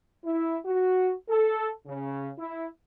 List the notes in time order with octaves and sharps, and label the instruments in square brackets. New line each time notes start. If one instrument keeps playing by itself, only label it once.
[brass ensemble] E4
F#4
A4
C#3
E4